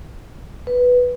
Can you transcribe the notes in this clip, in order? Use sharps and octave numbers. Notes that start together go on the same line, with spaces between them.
B4